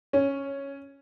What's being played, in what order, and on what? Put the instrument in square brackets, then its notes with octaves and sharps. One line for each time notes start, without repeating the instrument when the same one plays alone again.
[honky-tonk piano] C#4